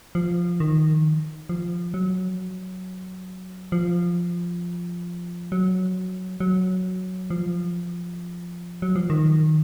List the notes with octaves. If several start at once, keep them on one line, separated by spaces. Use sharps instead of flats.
F3
D#3
F3
F#3
F3
F#3
F#3
F3
F#3
F3
D#3